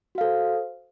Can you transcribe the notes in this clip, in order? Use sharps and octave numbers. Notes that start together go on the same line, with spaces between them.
F#4 A4 C5 F5